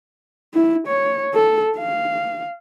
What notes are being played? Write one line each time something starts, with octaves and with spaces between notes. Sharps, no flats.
E4
C#5
A4
F5